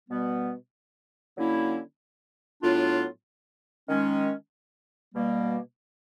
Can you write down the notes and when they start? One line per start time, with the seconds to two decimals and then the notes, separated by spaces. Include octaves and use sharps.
0.09 B2 G3 B3
1.36 D3 F#3 A#3 C#4 E4
2.62 A2 F#3 B3 D4 F4
3.88 D#3 G#3 C#4
5.14 B2 G3 A#3